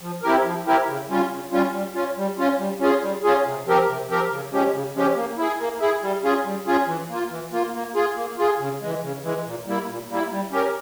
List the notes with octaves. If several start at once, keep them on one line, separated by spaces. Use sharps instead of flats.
F3
C4 E4 G4 A#4
F3
C4 E4 G4 A#4
C#3
G3 C#4 F4
C#3
G3 C#4 F4
G3
C#4 F4
G3
C#4 F4
G3
C#4 F4 G#4
G3
C#4 F4 G#4
C3
F3 C4 G4 A#4
C3
F3 C4 G4 A#4
C#3
F3 G#3 C#4 G4
C#3
F3 G#3 C#4 G4
A#3
E4 G#4
A#3
E4 G#4
G3
C#4 F4 G#4
G3
C#4 F4 G#4
E3
A#3 F4
E3
A#3 F4
A#3
F4 G#4
A#3
F4 G#4
C#3
E3 G#3
C#3
E3 G#3
A#2
G3 A#3 E4
A#2
G3 A#3 E4
G3
C#4 G4 A#4